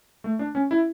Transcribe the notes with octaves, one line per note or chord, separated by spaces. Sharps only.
A3
D4
C#4
E4